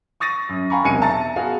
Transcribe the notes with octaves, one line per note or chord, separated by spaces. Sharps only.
C#6 D#6 A6 A#6 D#7
F#2
F5 G5 G#5 A#5 B5 C#6
E1 B1 C3 G#5 C#7 D#7
E5 A5 A#5 A6
B3 F#4 G#4 F5